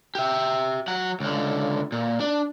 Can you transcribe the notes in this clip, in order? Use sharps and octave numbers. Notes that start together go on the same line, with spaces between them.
G4 E5
F#3 F#5
C#2 D3
A#2
D4